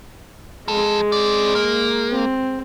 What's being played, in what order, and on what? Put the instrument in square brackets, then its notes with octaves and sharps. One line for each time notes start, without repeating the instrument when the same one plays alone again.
[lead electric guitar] F2 A4 [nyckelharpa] G#3
[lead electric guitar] C4 D5
A#3
[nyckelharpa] C4